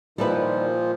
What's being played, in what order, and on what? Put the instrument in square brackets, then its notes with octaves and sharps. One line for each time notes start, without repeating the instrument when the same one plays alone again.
[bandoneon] A#2 F3 [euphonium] D#3 [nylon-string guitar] G3 E4 B4